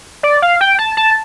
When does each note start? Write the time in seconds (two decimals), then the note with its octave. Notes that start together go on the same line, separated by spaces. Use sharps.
0.23 D5
0.42 F5
0.61 G5
0.79 A5
0.97 A5